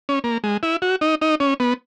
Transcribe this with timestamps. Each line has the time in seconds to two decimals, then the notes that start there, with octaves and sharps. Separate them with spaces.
0.09 C#4
0.24 A#3
0.44 G#3
0.63 E4
0.82 F#4
1.01 D#4
1.21 D#4
1.40 C#4
1.60 B3